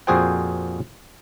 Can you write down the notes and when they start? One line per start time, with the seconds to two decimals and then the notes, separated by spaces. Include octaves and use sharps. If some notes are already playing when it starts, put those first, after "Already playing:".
0.07 F2 A#2 F#4 G#4 C5 G5